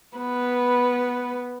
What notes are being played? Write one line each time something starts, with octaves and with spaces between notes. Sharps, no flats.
B3 B4